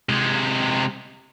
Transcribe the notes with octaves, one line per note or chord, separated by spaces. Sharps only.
C3 G#3